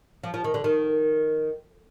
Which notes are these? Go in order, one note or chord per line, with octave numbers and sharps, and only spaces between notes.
F3
F3
D#3
D3
D#3